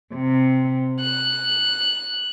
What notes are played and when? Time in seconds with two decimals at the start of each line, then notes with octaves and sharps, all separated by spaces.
0.13 C3
0.99 F#6